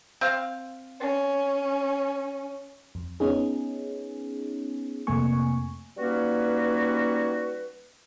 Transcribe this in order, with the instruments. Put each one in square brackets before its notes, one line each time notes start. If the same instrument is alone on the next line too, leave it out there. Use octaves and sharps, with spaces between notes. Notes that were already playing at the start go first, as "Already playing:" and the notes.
[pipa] C4 F5
[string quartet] C#4
[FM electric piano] F2
B3 C#4 D#4 G#4
F2 C3 A3 A#3 G#5 C#6
[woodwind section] G3 A#3 C#4 D#4 F#4 B4